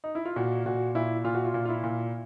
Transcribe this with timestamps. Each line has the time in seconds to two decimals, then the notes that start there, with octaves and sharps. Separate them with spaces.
0.04 D#4
0.15 E4
0.25 F4
0.36 A#2 F#4
0.66 A#2 F#4
0.95 A#2 E4
1.24 A#2 F4
1.35 F#4
1.45 F4
1.54 A#2
1.65 F4
1.69 E4
1.84 A#2